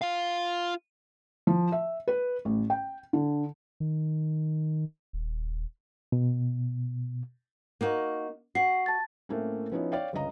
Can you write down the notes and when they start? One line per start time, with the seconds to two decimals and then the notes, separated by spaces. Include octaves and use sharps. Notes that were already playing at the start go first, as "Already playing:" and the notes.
0.02 F4 F5
1.47 F3
1.72 E5
2.08 B4
2.45 A1
2.70 G5
3.13 D3
3.80 D#3
5.13 D#1
6.12 B2
7.81 A#3 D#4 F#4
8.55 F#4 F#5 C7
8.86 A5 A6
9.29 A2 A3 A#3 C4 C#4
9.72 F3 B3 C#4 D#4 E4 C#5
9.92 C#5 D5 F5 G5
10.13 G1 C#2 C#3 D#5 A#5